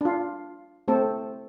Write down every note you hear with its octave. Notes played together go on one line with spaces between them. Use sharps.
D4 F4
A3 C4 A4